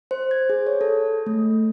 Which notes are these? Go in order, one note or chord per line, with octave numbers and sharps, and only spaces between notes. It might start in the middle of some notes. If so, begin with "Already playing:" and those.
C5
G#6
G#4
C#5
A4
A3